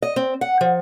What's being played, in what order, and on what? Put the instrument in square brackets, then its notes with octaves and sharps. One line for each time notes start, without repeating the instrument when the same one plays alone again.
[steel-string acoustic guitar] D#5
C4
F#5
F3